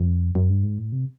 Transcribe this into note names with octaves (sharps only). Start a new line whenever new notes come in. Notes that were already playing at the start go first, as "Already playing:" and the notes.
Already playing: F2
F#2
G2
G#2
A2
C3